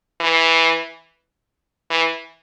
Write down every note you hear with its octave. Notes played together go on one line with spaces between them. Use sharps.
E3
E3